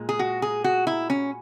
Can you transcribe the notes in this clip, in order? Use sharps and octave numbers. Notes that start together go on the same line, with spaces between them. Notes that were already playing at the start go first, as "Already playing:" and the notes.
Already playing: A#2 G#3
G#4
F#4
G#4
F#4
E4
C#4